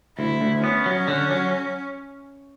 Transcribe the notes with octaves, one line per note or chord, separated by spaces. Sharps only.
D2 E4
D2
B3 C#4
F#3
D3
F#3